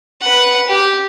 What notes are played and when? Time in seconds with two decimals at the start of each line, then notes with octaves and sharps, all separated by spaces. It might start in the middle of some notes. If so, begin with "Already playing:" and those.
0.21 B4 F#5
0.67 G4